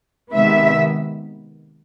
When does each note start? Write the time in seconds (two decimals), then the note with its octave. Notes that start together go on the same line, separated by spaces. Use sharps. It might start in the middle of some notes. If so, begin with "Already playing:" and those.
0.33 C3 D#3 G#3 B3 E5